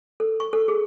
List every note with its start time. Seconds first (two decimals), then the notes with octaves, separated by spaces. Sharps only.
0.20 A4
0.40 C#6
0.53 A4
0.68 G#4